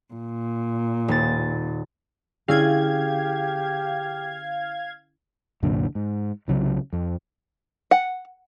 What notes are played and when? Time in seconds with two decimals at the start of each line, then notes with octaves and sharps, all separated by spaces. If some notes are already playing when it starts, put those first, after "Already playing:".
0.14 A#2
1.08 D#1 A6
2.48 D3 C#4 E4 G4 G#4 F5 G#6
5.63 C2 F#2 A#2 D3
5.95 G#2
6.48 C2 C#3 F#3
6.93 F2
7.91 F#5